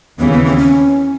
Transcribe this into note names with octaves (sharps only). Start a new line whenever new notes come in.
D#2 C#3 E3 B3
B3
C4
C#4